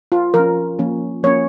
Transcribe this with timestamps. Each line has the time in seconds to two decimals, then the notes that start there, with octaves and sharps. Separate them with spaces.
0.12 F4
0.34 F3 A#4
0.39 C#4
0.79 F3 A#3 C#4
1.23 F3 A#3 C#4 C#5